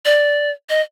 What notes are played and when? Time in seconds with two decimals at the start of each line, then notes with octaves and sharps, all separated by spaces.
0.05 D5
0.70 D#5